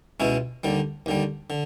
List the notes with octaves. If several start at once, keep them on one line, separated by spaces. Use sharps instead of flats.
C#2 B2 G#3 C#4 E4
D#2 D3 G3
D#2 D3 G3
D3